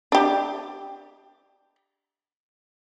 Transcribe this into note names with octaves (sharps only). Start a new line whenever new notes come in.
D4 G4